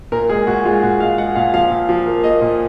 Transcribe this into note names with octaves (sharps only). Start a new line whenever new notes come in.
A#2 A#4
G#3 G#4
A#2 F#4
G#3 F4
A#2 F#4
G#3 F5
G#3 F#5
A#2 F5
F3 F5
A#2
F3
A#3
A#3 D#5
A#2